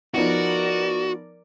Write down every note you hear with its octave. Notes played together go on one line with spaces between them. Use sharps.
F3 B3 D#4 F#4 A#4 D5